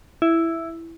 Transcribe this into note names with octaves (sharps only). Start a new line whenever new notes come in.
E4